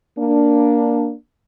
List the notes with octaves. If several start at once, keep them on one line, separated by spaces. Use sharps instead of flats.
A#3 D4